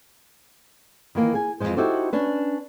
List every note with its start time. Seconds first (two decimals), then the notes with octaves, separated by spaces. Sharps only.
1.15 D#3 E3 A#3
1.34 G#4 G#5
1.60 F2 A2 E3 G#3 C5
1.77 D#4 E4 F#4 G4 A4 C5
2.13 C#4 D4 B4